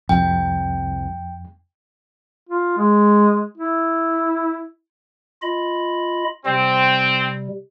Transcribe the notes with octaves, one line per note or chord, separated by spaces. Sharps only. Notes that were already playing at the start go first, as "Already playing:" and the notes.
C2 F2 C3 G5
F4
G#3
E4
F4 D#5 B5
C3 G3 C4